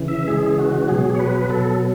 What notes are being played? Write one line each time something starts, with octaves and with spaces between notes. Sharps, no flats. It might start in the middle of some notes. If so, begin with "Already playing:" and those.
Already playing: C#3 E3
E5
C#3 E3 G#3 G#4
F#4
B2 F#3 G#4
C#5
B4
B2 F#3 A4